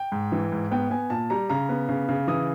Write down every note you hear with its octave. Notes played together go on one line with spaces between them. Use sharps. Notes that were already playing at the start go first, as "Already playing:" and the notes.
Already playing: G5
G#2
E3
G#2
B3 G5
B3 G#5
A#2 A5
G3 A#5
C#3 A#5
B3
C#3
C#3
E3 D#6